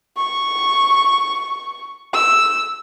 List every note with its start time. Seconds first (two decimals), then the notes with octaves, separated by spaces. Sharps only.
0.17 C#6
2.14 E6